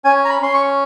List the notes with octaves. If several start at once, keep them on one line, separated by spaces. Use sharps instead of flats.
C#4 G#5
A#5
B5
C#4 C6
C#6